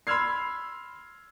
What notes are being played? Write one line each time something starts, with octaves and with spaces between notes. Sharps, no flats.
B5 C6 E6 F6 G#6 C7